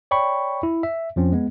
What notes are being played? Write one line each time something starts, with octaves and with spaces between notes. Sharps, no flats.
C#5 D5 G5 B5 C#6
E4
E5
F2 F3 C4 C#4
G#3 B3